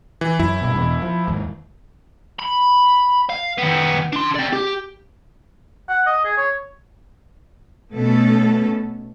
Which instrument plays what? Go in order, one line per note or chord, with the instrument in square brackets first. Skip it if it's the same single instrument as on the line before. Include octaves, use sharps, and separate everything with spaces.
[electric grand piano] E3
[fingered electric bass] F#2 [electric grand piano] E4
[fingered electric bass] G2 B2
E2 B2
F3
D#2 G#2
[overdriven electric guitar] B5
F5
D#3 B3
D4 C6
C4 D5
G4
[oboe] F#5
D#5
G#4
C#5
[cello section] B2 A3 B3 C#4 A4